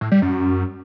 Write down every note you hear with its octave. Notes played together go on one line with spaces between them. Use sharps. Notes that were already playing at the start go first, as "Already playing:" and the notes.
A2
G3
F#2